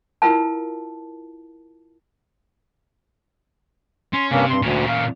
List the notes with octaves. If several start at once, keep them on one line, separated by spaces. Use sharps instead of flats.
E4 F4 A#4 B4 F5 A5
C#4 C6
G2 C3 A#3 C#4
G2 C6
D2 A#2 C#4
F5